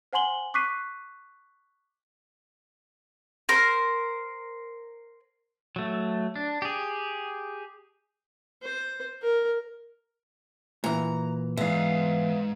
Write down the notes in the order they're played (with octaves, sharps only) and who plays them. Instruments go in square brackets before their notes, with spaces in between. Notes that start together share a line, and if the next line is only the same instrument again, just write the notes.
[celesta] C5 F#5 G#5 C6 F#7 G7
C#6 D6 F#6 B6 C7 D#7
[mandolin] A#4 C5
[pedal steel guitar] F#3 A3
D4
G4 G#4
[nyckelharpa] C5
A#4
[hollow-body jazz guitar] A#2 E3 [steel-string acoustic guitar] A#5
[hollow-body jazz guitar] B1 E2 [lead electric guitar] G#2 [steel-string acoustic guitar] B3 [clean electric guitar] E5 F5